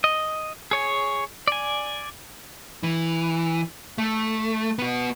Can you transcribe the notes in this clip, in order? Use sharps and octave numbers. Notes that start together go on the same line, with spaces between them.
D#5
G#4 C#5 G#5
D5 G#5
E3
A3
B3 F#4